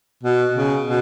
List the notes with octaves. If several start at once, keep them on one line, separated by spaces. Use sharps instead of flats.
B2
C#3
B2